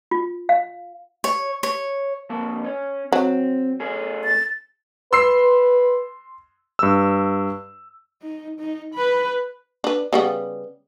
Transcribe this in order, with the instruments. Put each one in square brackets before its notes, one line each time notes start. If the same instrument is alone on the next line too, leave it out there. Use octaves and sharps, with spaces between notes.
[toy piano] F4
F5
[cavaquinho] C#5
C#5
[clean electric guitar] F2 A#3 A5
C#4
[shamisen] F#3 [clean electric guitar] C4
[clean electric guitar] A3 C#4 G#4
[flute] A6
[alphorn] B4 [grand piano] C6 E6 C7
[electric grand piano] G2 E6
[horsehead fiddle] D#4
D#4
B4 B5
[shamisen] D4 B4
C#3 G3 B3